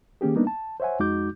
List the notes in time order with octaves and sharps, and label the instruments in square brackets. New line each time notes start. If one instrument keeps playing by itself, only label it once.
[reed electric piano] D#3 A#3 C#4 G4 G#4
G3 A#3 B3 D4 D#4
A5
C5 C#5 E5 F#5 G#5
F2 G#3 D#4 F#4 D6 G6